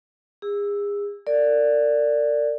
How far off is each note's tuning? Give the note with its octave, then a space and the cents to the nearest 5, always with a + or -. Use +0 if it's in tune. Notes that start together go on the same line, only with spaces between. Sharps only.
G#4 -35 E6 +0
A#4 -40 D5 +0